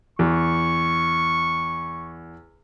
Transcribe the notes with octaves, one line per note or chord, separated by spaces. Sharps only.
E2 C#6